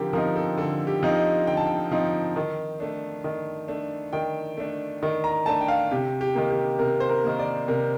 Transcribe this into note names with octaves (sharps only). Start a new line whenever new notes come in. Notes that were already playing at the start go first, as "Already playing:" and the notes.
Already playing: D3 F3 C4 G4 A#4
F3 C4 D#4 A#4
A4
D3 A4
G4
F3 C4 D#4
D#5
D3 G5
A5
G5
F3 C4 D#4
D#3
A3 D4
D#3
A3 D4
D#3 G5
A3 D4
D#3
A#5
A3 D4 A5
G5
F5
C3 G4
G4
D#3 A#3
G4
C3 A#4
C5
A#4
D#3 A#3
D5
C3 A#4